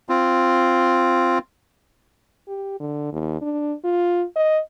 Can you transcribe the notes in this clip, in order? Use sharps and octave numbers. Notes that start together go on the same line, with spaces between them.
C4 F4
G4
D3
D#2
D4
F4
D#5